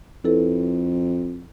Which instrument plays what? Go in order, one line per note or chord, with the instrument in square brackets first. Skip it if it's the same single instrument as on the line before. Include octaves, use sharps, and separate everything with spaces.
[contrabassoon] F2 [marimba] E4 A4 B4